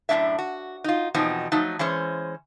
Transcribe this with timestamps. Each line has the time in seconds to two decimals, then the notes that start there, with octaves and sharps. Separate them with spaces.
0.09 F#2 A2 A#3 D4 E5
0.38 F#4
0.84 D#4 F4
1.14 E2 B2 F3 C4 D#4
1.52 F3 F#3 A3 D#4
1.79 E3 G#3 C#4 C5